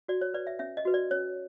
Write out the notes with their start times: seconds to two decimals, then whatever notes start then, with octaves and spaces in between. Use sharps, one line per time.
0.08 F#4 D5
0.21 C#5
0.34 B4 D5
0.47 E5
0.59 C#4 E5
0.77 D#5
0.85 F#4 B4
0.94 D5
1.11 C#4 C#5